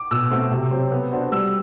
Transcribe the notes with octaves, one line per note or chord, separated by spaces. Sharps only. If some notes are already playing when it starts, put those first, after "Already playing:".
Already playing: D6
B2 E6
A3 C4 F#4
C3
F#3 C4 G4 C5
B3
D4 F#4 C5
G3 E6